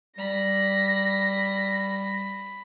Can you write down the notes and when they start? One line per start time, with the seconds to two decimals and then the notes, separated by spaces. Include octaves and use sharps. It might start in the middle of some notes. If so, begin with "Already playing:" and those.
0.18 G3 B5 A#6